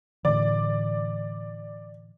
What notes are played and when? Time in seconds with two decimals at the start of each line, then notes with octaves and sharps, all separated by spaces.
0.25 A2 D3 E3 D5